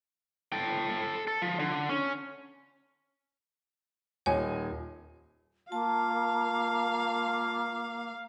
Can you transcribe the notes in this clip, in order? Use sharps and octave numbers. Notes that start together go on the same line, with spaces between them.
A4 G5
A4
F3
D3
C#4
D#1 D#4 C#5 G#5
A#3 F4 F5 A5